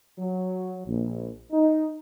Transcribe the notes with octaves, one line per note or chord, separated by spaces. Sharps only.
F#3
A#1
D#4